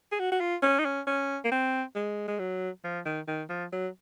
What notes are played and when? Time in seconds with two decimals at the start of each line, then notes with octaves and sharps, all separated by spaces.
0.12 G#4
0.19 F#4
0.32 F#4
0.40 F4
0.62 C#4
0.79 D#4
0.85 C#4
1.07 C#4
1.44 A#3
1.52 C4
1.96 G#3
2.28 G#3
2.39 F#3
2.84 F3
3.05 D#3
3.28 D#3
3.49 F3
3.72 F#3